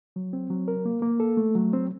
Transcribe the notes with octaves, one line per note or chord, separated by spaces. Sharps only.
F#3
C4
F#3
A#4
A#3
A#3
A4
A3
F#3
C4